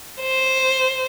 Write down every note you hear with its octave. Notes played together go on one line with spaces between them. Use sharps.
C5